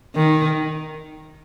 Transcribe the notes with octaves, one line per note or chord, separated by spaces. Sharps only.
D#3